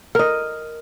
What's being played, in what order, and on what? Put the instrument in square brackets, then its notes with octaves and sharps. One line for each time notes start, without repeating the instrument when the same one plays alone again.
[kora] A#4 D#5